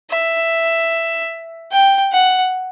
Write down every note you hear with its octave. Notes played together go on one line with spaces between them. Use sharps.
E5
G5
F#5